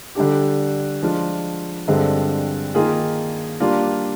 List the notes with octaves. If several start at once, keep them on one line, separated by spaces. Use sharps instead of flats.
D3 G3 D4 G4
F3 G#3 D4 F4
G2 D3 G#3 C4
D#3 A#3 F4 G#4
G3 A#3 D4 F4